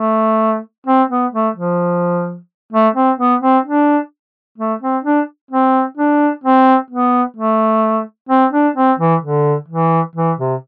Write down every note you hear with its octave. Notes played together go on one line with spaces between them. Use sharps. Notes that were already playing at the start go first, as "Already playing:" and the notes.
Already playing: A3
C4
B3
A3
F3
A3
C4
B3
C4
D4
A3
C4
D4
C4
D4
C4
B3
A3
C4
D4
C4
E3
D3
E3
E3
C3